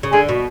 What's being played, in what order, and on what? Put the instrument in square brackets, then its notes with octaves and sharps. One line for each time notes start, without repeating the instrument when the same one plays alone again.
[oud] C#3
[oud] D3 [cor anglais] G#4
[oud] B2